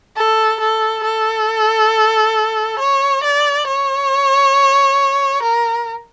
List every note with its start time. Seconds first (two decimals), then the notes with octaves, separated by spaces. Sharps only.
0.16 A4
0.60 A4
1.04 A4
2.79 C#5
3.24 D5
3.67 C#5
5.43 A#4